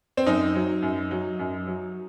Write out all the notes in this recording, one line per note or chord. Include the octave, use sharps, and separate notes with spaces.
C4
F#2 D#4
F#3
F#2
F#3
F#2
F#3